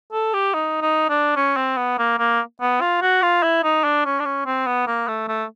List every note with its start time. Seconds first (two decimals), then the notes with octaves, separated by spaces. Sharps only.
0.12 A4
0.34 G4
0.54 D#4
0.82 D#4
1.10 D4
1.36 C#4
1.57 C4
1.77 B3
1.98 A#3
2.19 A#3
2.61 B3
2.81 F4
3.02 F#4
3.22 F4
3.43 E4
3.64 D#4
3.84 D4
4.05 C#4
4.20 D4
4.25 C#4
4.46 C4
4.67 B3
4.87 A#3
5.08 A3
5.28 A3